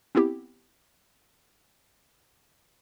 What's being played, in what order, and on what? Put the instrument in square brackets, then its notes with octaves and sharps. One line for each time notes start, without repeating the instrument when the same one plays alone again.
[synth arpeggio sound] B3 C4 E4 G4